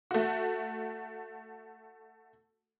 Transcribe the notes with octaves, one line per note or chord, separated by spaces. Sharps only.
A3 F#4